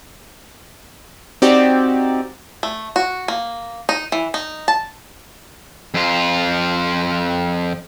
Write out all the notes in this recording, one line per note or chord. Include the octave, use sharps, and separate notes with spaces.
C4 D#4 F#4 G4 D5
A3
F#4
A#3
D#4
E3
D#4
A5
F2 F4